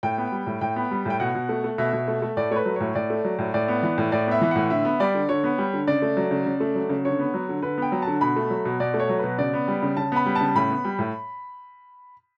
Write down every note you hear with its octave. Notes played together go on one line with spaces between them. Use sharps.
A2 G5
B3
G3
A2
A2 G5
B3
G3
A2 G5
B2 F#5
B2
A3
A3
B2 E5
B2
A3
A3
A2 D5
A3 B4 C#5
F#3
A2 C#5
A2 D5
A3
F#3
A2
A2 D5
B3
E3
A2
A2 D5
B3 E5
E3
A2 F#5
D3 E5
B3
G3 D5
D3
D3 C#5
B3
G3
D3
C#3 D5
A3
F#3
C#3
C#3
A3
F#3
C#3
D3 C#5
B3
F#3
D3
D3 B4
B3 G5
F#3
A5
D3
B2 B5
A3
F#3
B2
B2 D5
A3
C#5
F#3
B2 B4
C#3 D5
B3
G3
C#3
C#3 A5
B3 B5
G3
A5
C#3
A2 B5
B3
G3
A2